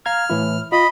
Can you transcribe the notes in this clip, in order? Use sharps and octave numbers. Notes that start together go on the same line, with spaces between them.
F5 A#5 F6 G#6
A2 E3 E4
F4 D#5 B5